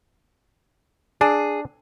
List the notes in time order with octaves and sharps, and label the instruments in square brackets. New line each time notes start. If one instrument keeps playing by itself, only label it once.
[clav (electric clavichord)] D4 [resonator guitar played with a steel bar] G#4